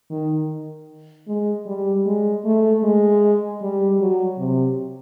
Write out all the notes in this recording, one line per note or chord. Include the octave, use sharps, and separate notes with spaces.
D#3
G#3
G3
G#3
A3
G#3
G3
F#3
C3